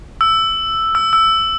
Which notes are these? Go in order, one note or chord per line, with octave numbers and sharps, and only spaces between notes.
E6
E6
E6